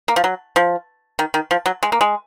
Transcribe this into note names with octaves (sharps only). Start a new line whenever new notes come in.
A#3
F3
F#3
F3
D#3
D#3
F3
F#3
G#3
A#3
G#3